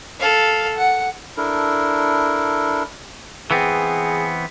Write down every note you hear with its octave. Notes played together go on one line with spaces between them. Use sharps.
A4 F5
F#5
D4 E4 A4 A#4
E3 B3 C4 G#4